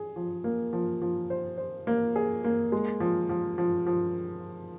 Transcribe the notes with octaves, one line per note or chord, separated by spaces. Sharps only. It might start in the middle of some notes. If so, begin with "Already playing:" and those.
Already playing: G#4
F3
A#3
F3
F3
C5
C5
A#3
G#4
A#3
G#3
F3
F3
F3
F3